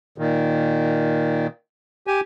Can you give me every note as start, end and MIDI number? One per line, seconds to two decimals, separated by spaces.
0.18 1.47 46
0.18 1.47 51
2.07 2.21 67
2.07 2.21 80